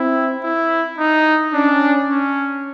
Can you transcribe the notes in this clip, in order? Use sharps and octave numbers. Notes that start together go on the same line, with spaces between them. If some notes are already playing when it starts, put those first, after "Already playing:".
Already playing: C4 E4
E4
D#4
C#4 D4
C#4